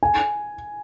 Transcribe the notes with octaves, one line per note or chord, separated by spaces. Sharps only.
G#5